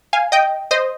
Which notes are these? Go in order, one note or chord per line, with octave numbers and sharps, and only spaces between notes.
F5 G#5
D#5 G5
C5 D#5